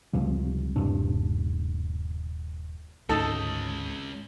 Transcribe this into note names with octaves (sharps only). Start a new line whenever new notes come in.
C#2 C3 F3 G3
D#1 G2 C3 D4
G#1 D2 G#3 C#4 D#4 A4